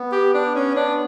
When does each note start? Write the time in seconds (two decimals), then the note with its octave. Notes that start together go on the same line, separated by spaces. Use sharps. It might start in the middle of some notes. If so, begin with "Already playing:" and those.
Already playing: B3
0.12 G4
0.34 D4
0.55 C#4
0.76 D4